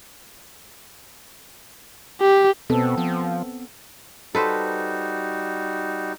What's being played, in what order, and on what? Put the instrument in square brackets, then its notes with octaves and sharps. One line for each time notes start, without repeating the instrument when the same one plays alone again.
[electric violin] G4
[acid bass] B2 [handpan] B3 C4 A4
[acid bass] F3
[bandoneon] G3 D#4 F#4 [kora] A4 B4 C5